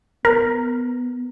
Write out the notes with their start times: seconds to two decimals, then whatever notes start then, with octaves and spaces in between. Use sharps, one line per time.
0.25 B3 A#4